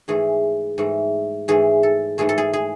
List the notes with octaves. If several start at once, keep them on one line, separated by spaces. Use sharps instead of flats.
G#2 E3 A3 G#4
G#2 E3 A3
G#2 E3 A3 G#4
A4
G#2 E3 A3 G#4
A4
G#4
G#4